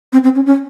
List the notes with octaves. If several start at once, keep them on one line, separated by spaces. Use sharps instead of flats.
C4
C4
C#4
C#4